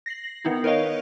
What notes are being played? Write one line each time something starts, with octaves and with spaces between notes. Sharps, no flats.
A#6 C7 F#7
D#3 B3 D#4 E4
A#4 B4 C#5 D#5 F5 C#6